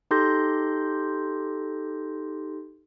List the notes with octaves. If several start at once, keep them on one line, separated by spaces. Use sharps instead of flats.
D#4 G4 A4 C6 G6 A#6